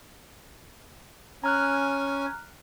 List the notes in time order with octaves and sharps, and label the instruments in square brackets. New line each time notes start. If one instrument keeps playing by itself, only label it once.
[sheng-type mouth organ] C#4 G#5 [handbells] A#5 F6 F#6